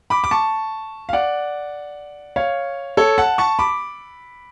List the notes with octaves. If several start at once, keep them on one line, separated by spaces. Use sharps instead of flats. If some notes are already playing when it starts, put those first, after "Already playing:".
B5 D6
D6
A5 C#6
F5
D5 F#5
C#5 F5
A4 C#5
F#5 A5
A5 C#6
B5 D6